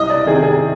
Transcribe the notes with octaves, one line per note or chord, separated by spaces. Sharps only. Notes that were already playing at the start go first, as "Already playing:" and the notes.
Already playing: C2 D#5
D5
C3 D#3 G#4
G#4